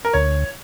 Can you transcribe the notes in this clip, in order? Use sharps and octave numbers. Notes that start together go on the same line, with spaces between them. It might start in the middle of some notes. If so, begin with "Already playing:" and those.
A#4
D2 C#5